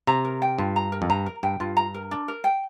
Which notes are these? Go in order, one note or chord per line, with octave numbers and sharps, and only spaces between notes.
C3 A#5
A#4
G5
G2 F4
A#5
A#4
F2
G2 A#5
A#4
G2 G5
G2 F4
A#5
A#4
D4
A#4
G5